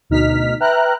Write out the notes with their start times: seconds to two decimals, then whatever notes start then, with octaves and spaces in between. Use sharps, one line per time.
0.10 D2 B2 D#4 F6 B6
0.60 B4 E5 G5 A#5 F6 F#6